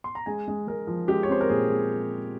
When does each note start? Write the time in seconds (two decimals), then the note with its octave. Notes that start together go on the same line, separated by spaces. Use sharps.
0.04 C6
0.15 A#5
0.26 G#3 G#5
0.48 G#3
0.67 G#3 A#4
0.87 F3
1.08 G#3 G4
1.23 C#5
1.29 C4 C5
1.41 A#4
1.49 A#2 G#4
1.70 G#3